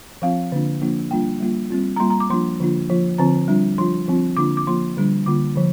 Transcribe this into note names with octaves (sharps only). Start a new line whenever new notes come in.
F3 C4 F4 F5
D3 A#3 D4 F4
F3 A#3 D4 F4
G3 A#3 D4 F4 G5
G3 A#3 F4
G3 C4 F4
A#5
G3 A#3 F4 C6
A#5
D6
F3 A#3 D4 F4 C6
D3 F3 A#3 D4 F4
F3 A#3 F4
D3 F3 C4 F4 A#5
G3 D4 F4
F3 D4 F4 C6
F3 C4 F4
D3 A#3 D4 F4 D6
D6
F3 A#3 F4 C6
D3 G3 D4
D3 A#3 F4 D6
D3 F3